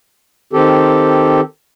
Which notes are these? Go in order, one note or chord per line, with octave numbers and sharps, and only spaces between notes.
D#3 C4 G4 A4